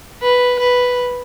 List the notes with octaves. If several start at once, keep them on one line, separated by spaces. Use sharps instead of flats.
B4
B4